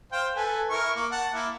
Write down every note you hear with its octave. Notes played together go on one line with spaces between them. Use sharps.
C5 F5 G5
A4 B4 G#5
E4 A#4 C#6
A#3
F#5 A5
A#3 E4